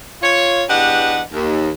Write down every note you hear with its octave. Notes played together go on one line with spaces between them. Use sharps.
F4 C#5
E2 D4 G4 B4 D#5 F#5
D#2